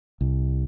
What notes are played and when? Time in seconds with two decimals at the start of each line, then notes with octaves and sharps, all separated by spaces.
0.21 C2